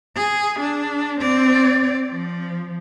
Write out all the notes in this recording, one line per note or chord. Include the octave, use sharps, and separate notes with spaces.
G#4
D4
C4 D5
F3